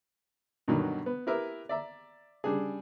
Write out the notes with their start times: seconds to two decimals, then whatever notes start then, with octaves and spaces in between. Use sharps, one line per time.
0.68 G2 B2 D3 D#3 F#3
1.06 B3
1.27 E4 G4 A#4 B4 E5
1.69 D5 E5 A#5
2.44 C#3 G3 D4 G#4